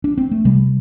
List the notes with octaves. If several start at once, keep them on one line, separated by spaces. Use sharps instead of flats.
D4
C4
A3
C3 G3